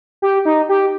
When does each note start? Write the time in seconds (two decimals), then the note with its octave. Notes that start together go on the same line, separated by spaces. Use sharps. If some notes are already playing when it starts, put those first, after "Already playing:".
0.22 G4
0.45 D#4
0.69 G4